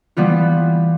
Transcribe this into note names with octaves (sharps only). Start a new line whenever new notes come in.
E3 G3 B3 F4